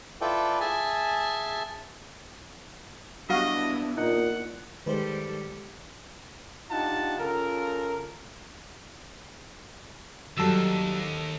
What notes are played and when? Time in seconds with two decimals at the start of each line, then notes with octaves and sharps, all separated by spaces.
0.21 E4 F4 A4 B4 D5 G5
0.60 G#4 E5 G#5 A5
3.29 G3 B3 D4 E4 F#4 D#5 F5
3.97 A#2 D#4 F#5
4.86 D#3 G3 G#3 G4 A4 B4 C5
6.71 D4 D#4 F4 G4 F#5 A5
7.19 C#3 F4 A4 A#4
10.38 D#2 F#3 G3 A4 E6